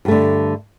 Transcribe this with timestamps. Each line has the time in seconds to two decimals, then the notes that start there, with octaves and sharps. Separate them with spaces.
0.05 G2
0.08 A3
0.11 D3